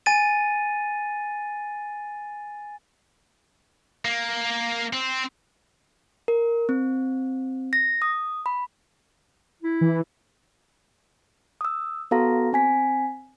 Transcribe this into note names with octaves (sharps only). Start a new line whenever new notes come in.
G#5 A6 D#7
A#3
C4
A#4
C4
A#6
D#6
B5
E4
E3
D#6 E6
B3 F#4 A4 F5 A#5 A#6
C4 G#5 B6